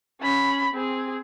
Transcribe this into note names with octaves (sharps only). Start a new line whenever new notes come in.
C#4 B5
C4 G#4